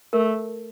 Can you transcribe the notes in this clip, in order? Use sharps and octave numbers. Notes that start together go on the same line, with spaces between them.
A3 A#4